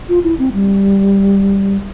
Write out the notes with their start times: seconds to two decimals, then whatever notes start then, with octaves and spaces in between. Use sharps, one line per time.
0.09 F4
0.24 E4
0.39 C4
0.53 G3